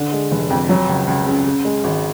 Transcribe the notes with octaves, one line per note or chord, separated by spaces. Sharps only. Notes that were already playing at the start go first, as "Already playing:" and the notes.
Already playing: D3
G#3
F1
F2
F#3
C#2
C#2
C#3
C#3
G#3
G#1